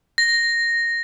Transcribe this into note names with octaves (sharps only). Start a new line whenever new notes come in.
A#6